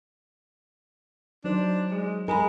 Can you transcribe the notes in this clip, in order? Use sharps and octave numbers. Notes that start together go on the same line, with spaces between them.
F#3 D4 D#4 C5
G#3
G#3 A#4 G#5 A#5 B5